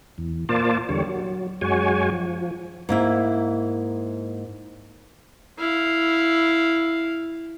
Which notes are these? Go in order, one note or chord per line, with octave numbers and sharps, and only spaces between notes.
E2
A#2 A#3 F4 C5 D5 A5
E2 D3 G3 C#5
F#3
F#2 G#3 F#4 C#5 G#5
F3
G#2 A#3 E4
E4 F5